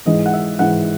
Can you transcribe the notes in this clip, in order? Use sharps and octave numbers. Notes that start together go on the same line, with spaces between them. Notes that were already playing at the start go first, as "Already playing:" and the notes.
G#2 E3 D#5
F#5
E5
G#2 E3 F#5